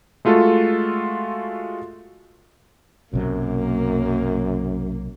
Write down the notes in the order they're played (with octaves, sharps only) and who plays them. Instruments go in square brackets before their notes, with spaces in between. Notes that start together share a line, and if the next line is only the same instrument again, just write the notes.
[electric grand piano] G#3 A3 F4 F#4 A4
[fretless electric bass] B1 C3 F#3 [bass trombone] F#2 [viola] A#3